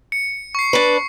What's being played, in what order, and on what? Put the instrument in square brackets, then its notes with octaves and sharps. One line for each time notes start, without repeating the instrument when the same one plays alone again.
[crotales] C#7
C#6 C7
[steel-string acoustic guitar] D4 B4